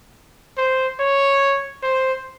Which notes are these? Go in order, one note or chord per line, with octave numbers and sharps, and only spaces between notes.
C5
C#5
C5